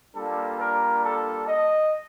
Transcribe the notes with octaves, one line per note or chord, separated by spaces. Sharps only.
G3 A#3 D4 F4 A4
A#4
A4
D#5